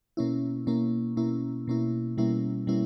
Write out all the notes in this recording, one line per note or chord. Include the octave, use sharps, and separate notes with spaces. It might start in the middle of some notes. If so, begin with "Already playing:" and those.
B2 A#3 C#4 E4
B2 A#3 C#4 E4
B2 A#3 C#4 E4
B2 A#3 C#4 E4
B2 G3 A#3 C#4 E4
B2 G3 A#3 C#4 E4